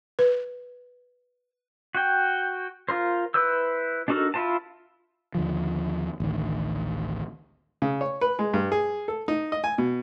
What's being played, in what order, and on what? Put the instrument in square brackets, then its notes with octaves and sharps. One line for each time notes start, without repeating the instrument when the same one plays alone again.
[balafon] B4
[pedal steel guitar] F#4 G5
F4 A#4 C5
E4 B4 C5 E6
D4 D#4 F#4 A4 A#4
E4 F4 C5 A5
[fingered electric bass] D#2 D3 F3
A1 D2 D#3
[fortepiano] C#3
C#5
B4
G#3
G2
G#4
A4
D#4
D#5
G#5
B2